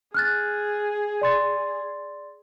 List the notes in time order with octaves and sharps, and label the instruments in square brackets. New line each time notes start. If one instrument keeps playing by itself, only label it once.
[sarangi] G#4 [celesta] F6 F#6 A6
[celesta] D5 C6 A6